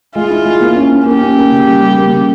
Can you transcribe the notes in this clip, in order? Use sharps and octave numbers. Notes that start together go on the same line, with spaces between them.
G#3 F4
E4
G#3
A#3
C#4
C#4
A#3 G4
C#4
A#3
C#3
G3
G3
A#3
C#3